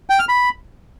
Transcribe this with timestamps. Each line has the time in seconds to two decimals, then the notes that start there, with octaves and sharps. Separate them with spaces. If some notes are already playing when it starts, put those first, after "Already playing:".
0.10 G5
0.19 F6
0.29 B5